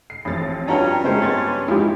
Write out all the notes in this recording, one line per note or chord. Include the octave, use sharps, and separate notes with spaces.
C7
A1 F2 A6
G2 C#4 D4 F4 F#4 G5 A5 A#5
C#3 G#3 A#4 C5 E5 G5
B3 G5 C6 G#6 A6
F3 G#3 D#4 E4 G4